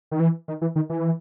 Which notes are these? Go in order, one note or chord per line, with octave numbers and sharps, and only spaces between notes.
D#3
E3
D#3
E3
D#3
E3